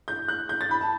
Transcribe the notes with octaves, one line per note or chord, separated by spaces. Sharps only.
G6
F#6
G6
A6
B5
A5